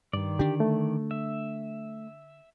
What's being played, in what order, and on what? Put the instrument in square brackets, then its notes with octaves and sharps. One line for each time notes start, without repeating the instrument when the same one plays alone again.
[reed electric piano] G2 [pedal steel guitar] D#3 D5
[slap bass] D3 D4 [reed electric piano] G4
[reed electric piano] A3
[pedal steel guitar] E5